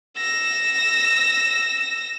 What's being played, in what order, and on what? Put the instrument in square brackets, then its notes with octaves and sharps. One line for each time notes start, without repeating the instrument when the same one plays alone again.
[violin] E6 A#6